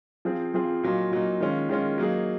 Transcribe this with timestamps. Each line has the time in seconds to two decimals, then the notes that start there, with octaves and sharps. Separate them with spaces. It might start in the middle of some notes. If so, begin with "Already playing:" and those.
0.25 F3 C4 F4 G#4
0.54 F3 C4 F4 G#4
0.83 A#2 F#3 A#3 D#4
1.11 A#2 F#3 A#3 D#4
1.40 D#3 G#3 C#4 F4
1.69 D#3 G#3 C#4 F4
1.98 F#3 A#3 D#4 G#4